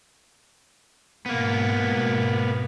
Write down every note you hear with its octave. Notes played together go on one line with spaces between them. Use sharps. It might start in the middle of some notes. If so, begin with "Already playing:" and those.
G#2 B2 A#3 B3